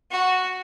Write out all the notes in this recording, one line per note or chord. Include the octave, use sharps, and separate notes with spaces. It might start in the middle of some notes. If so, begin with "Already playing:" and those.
F#4